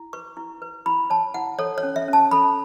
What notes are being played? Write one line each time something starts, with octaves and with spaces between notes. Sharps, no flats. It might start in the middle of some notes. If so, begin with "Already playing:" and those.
Already playing: E4
B4 C#6
E4
B4
E4 B5
C#5 A5
E4 F#5
A4 C#5
C#5
C#4
E5
C#4
A5
A4 B5